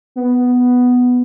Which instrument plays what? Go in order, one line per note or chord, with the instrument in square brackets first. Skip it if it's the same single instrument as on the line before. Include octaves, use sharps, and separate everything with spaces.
[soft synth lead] B3